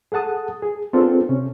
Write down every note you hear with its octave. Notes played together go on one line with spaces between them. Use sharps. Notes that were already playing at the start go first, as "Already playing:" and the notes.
G#4 A4 F#5 A5 D#6
G#4
B3 C4 D4 F4 G#4 A4
C3 C#4